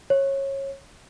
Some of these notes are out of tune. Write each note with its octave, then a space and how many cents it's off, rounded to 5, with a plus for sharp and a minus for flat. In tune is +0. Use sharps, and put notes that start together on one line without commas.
C#5 -20